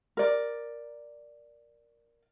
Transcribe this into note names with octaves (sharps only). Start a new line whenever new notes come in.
A#4 D5